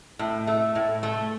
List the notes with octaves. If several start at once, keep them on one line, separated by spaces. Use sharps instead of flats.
A2
A3
A2
A3